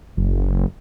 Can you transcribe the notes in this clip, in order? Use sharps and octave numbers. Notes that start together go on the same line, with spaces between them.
F#1